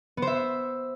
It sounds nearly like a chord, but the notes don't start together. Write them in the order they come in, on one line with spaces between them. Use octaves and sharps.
B3 C5 E5